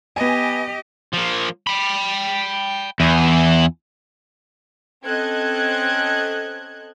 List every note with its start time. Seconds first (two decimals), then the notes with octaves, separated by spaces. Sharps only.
0.16 B3 G4 D#5 G#5
1.14 F3 A#3
1.67 G5 B5
3.00 E2 E4 G#5
5.05 C4 C#4 A4 D#5 F#6 G#6